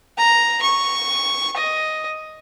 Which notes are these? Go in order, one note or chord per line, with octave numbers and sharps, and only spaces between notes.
A#5
C#6
D#5